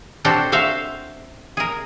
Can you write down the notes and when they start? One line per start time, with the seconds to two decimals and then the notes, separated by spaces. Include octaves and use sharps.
0.25 C4 D4 F#4 G4 A4 C5
0.52 F#4 C5 E5 F5
1.57 G#4 A#4